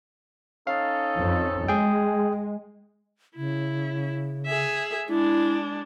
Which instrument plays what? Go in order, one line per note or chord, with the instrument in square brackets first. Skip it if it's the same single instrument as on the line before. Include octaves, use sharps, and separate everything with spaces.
[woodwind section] C#4 D#4 A4 [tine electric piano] F5
[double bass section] F2
[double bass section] G#3 [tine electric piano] G#4 G5
[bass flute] C#3 [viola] E4
[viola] G#4 E5
[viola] G#3 D4 [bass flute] E4